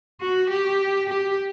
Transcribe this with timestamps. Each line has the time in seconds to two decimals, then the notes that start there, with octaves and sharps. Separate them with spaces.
0.21 F#4
0.50 G4
1.09 G4